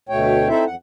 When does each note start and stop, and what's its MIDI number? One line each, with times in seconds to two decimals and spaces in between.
0.09 0.48 38
0.09 0.48 47
0.09 0.48 57
0.09 0.48 73
0.09 0.48 79
0.48 0.65 60
0.48 0.65 63
0.48 0.65 64
0.48 0.65 69
0.48 0.65 72
0.48 0.65 76
0.66 0.75 41
0.66 0.75 78